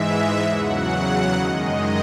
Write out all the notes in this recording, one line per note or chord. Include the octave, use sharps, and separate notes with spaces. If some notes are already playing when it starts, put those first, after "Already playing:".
Already playing: G#2 E3 G#3 E5
E2 C#3 F#3 F#5
F#2 D#3 G#3 D#5